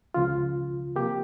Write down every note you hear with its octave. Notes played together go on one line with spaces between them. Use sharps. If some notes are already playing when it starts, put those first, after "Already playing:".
C#2 C#3 F3 F4
C3 F3 A#3 G4